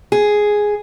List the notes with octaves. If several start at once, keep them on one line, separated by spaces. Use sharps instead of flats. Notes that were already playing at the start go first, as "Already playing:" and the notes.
G#4